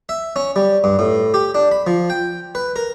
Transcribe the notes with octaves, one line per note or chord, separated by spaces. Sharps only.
E5
C#4
G3
G2
A2
G4
D4
B5
F3
G5
B4
A#4